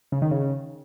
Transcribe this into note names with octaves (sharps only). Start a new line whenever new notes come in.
C#3
D#3
C#3